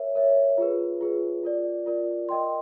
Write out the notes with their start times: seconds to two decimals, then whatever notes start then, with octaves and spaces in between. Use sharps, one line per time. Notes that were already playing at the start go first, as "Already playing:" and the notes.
Already playing: A#4 C#5 E5
0.15 A#4 C#5 E5
0.58 F4 G#4 B4
1.01 F4 G#4 B4
1.43 F4 A#4 D5
1.86 F4 A#4 D5
2.29 A#4 D#5 G5 C6